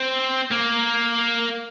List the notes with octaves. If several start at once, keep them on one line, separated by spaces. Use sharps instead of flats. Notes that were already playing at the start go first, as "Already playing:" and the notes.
Already playing: C4
A#3